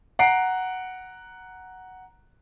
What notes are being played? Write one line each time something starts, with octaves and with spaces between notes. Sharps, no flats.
F#5 A#5 C7 D7